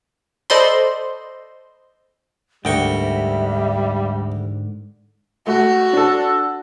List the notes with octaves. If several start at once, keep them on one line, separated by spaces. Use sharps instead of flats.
A4 C5 D5 D#5 B5 C6
D2 G#2 D3 G3 A#4 E5 G5 C#6
A3 F#4
D4 A4